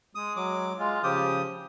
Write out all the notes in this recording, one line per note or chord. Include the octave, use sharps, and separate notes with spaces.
G#3 D#6
F#3 D6
G#3 F4
C#3 F3 G4 D#6